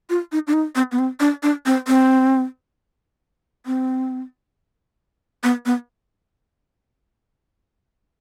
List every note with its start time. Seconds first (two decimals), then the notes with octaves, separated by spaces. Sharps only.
0.10 F4
0.32 D#4
0.47 D4
0.53 D#4
0.75 C4
0.92 B3
0.99 C4
1.20 D4
1.43 D4
1.66 C4
1.88 C4
3.66 C4
5.43 B3
5.66 B3